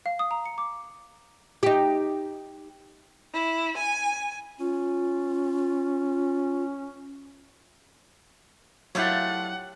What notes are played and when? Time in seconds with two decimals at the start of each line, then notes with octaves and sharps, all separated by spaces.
0.06 F5
0.19 D#6
0.31 A#5
0.46 C#7
0.58 D6
1.63 D#4 G4
3.34 E4
3.78 G#5
4.60 C#4 F4
8.95 F#3 A3 D4 E4 F4 G4 C#5 F#5